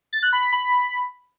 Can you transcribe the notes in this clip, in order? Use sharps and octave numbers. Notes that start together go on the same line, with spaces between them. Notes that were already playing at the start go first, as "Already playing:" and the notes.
A6
F#6
B5
B6
B5